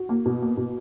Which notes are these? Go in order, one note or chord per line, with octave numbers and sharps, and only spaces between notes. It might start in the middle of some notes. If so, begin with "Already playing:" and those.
Already playing: F#4
A#3
B2
A#3
B2